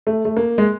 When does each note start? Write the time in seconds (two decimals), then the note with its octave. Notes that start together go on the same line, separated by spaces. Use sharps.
0.07 A3
0.25 A3
0.37 A#3
0.58 G#3